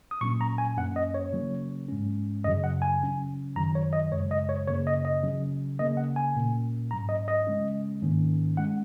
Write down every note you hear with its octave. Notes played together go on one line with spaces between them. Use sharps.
D#6
A#2 F#3 A#3 C#4 C#6
A#5
G#5
F#2 F#3 A#3 C#4 F#5
D#5
C#5
C#3 F#3 A#3 C#4
G#2 G#3 C#4
F#2 C#3 F#3 D#5
F#5
G#5
C#3 F#3 C#4
F#2 D#3 F#3 A#5
C#5
D#5
F#2 C#3 G#3 C#5
D#5
C#5
F#2 C#3 A#3 C#5
D#5
D#5
C#3 F#3 C#4
C#3 A#3 C#4 D#5
F#5
G#5
A#2 A#3 C#4
G#2 F#3 C#4 A#5
D#5
D#5
C#3 G#3 C#4
G#2 D#3 A#3 C#4
G#3 C#4 F#5